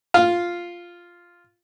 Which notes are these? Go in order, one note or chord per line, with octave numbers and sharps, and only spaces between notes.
F4 F5